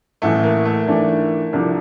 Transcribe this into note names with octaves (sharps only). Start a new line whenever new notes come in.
A1 A2 E3 A3
A#3
A3
G#2 E3 A3 D4
C2 C3 F3 A3 D4